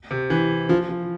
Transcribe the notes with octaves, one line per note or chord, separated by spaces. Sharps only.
C3
E3
F3
F3